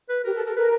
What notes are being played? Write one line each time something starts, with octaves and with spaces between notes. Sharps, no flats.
B4
G4 A#4
A4
A4 A#4
A#4 B4